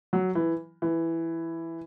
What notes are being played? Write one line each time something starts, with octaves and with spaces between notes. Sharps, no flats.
F#3
E3
E3